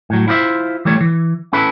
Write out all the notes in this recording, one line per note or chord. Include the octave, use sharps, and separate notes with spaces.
A2 F#3
E4 F4 C5 D5 E5
E3 G3 A3 C#5
E3
C#4 E4 A4 B4